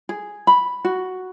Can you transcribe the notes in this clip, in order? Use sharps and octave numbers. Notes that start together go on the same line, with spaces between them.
G#4
B5
F#4